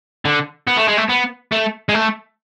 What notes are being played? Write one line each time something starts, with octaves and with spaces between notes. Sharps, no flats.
D3
B3
A3
G#3
A3
B3
A3
G#3
A3